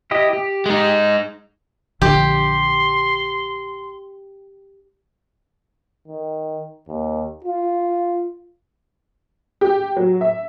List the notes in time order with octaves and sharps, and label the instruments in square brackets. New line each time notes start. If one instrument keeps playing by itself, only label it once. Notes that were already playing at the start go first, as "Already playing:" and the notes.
[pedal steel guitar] E4 G4 D#5
G4
[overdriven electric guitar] G#3 D#4
[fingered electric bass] A#1 D3 F3 [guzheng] G4 [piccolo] C6
[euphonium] D#3
D#2
F4
[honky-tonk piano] G4
F#3
E5